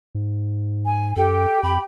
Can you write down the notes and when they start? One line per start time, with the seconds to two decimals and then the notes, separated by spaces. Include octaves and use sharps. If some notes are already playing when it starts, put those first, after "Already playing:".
0.15 G#2
0.84 G#5
1.16 F#2 G4 A4 G5
1.63 F2 B5